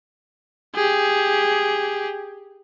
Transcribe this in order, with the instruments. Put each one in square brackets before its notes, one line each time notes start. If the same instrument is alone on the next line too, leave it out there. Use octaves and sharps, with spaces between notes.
[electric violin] G4 G#4